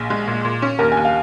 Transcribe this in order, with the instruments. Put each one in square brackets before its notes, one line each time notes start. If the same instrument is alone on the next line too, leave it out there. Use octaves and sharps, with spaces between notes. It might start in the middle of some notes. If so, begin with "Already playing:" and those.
Already playing: [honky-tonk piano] A#1 [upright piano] G#4
[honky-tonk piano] G#3
A#2
A#2
C#4
[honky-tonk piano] D#2 [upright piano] A#4
[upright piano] G#5
[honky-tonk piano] D#2
[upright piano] F5